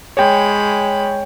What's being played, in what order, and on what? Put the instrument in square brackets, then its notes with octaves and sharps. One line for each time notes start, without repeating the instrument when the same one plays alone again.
[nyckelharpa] G#3 B5 [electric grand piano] C#5 G5